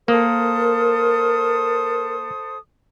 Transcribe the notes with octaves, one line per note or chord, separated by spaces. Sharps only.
A#3 A4 A#4 C5 D#6